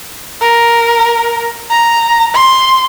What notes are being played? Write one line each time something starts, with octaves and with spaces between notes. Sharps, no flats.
A#4
A#5
C6